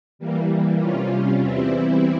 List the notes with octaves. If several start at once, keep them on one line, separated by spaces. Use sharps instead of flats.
E3 G3 A#3
C3 G3 C#4 F4
E2 E3 G3 C4 E4